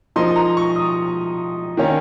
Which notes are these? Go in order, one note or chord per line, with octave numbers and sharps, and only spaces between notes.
F3 A#3 D#4 C6
A#5
C#6
D#6
D#3 A#3 C#4